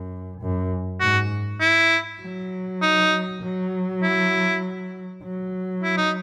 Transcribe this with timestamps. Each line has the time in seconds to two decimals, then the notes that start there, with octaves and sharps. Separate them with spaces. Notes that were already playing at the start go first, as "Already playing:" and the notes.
Already playing: F#2
0.41 F#2
1.00 G#2 F#4
1.61 E4
2.21 F#3
2.82 D#4
3.42 F#3
4.02 E4
5.23 F#3
5.83 E4
5.97 D#4